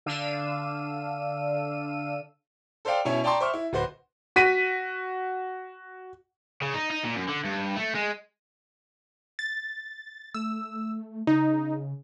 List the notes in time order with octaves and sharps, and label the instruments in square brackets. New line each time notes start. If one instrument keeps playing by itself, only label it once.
[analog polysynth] D3 D4 F5 E6 D#7
[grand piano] A4 C5 D5 F5 G5
B2 C#4 E4 C#5
D5 G5 A5 A#5 C6 C#6
C5 E5 C#6 D6 F6
E4
D1 F#4 B4 C5
[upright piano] F#4 B6 D#7
[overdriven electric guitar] C#3
D#4
D#4
A#2
F#2
D3
G2
A3
G#3
[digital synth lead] A6
[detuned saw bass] A3 [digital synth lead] E6
[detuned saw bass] C#3 [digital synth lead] D#4